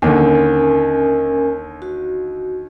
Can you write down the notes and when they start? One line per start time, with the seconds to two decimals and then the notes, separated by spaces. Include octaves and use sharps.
0.02 D#2 D3 C#4 A#4 G#5
1.82 F#4